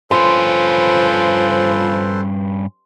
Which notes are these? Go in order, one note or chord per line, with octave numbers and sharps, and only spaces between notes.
G2 F3 C#4 A4 B4 C5 C6